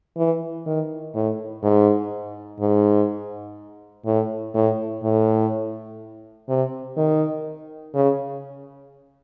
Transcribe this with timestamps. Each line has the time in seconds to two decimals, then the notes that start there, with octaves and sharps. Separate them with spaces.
0.17 E3
0.66 D#3
1.14 A2
1.63 G#2
2.60 G#2
4.06 A2
4.54 A2
5.03 A2
6.49 C3
6.97 D#3
7.94 C#3